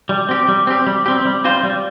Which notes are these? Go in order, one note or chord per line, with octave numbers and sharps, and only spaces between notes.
G3
C4 G4
G3
C4 G4
G3
C4 G4
G3
C4 F4 C5
G3